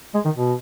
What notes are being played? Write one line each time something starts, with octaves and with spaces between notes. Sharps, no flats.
G#3
D#3
B2